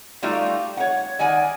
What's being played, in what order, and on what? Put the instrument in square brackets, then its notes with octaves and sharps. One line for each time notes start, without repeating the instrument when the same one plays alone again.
[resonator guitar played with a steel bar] G3 A3 D#4 F4 F#4 D5
C#5 F#5
D#3 D5 F#5 G#5